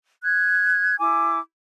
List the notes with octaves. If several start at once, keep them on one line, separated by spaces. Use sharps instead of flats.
F#6 G#6
E4 G#5 D6